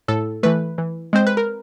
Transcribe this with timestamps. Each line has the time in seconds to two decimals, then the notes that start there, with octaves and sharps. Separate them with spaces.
0.08 A2 A4
0.43 E3 A3 B4
0.78 E3
1.13 G#3 C4 C5
1.27 B4
1.37 A#4